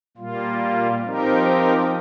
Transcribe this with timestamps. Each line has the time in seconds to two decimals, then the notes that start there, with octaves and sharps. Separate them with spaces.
0.17 A#2 G3 A#3 F4
1.05 F3 C4 D#4 G4 A#4